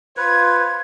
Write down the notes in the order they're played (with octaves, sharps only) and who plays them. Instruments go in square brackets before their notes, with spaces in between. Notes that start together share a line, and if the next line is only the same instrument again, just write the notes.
[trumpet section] F4 C5 [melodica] B4 [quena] G#6